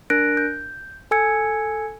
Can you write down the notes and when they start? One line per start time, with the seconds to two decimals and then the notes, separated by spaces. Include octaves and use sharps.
0.10 D4 A#4 F#6 A#6 D7
0.37 G6
1.11 A4 G#5 E6 G#6 C#7